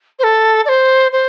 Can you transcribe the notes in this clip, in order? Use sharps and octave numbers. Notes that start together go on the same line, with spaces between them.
C5
A4
D5
C5
C5